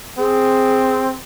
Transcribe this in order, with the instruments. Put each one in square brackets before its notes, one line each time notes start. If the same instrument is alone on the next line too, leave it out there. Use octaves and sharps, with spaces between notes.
[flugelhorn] C4 [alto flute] G#4